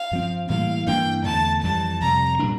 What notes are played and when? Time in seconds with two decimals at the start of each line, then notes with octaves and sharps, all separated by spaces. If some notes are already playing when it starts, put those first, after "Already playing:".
Already playing: F5
0.11 G2 F3 C4
0.49 A2 E3 G3 A#3 F5
0.87 G2 E3 A#3 D4 G5
1.25 E2 D3 A3 A5
1.63 F2 E3 G3 A5
2.01 F2 C3 G3 A#5
2.39 A#2 G3 D4